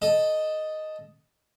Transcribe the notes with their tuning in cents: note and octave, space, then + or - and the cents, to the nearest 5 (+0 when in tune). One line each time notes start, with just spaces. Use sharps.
A4 +0 D#5 +0